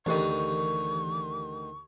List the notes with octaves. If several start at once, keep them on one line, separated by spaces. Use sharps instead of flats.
D2 D#3 E3 G4 A#4 C#6